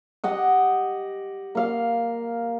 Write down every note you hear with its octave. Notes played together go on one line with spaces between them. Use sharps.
G4 D#5 F#5
A#3 F5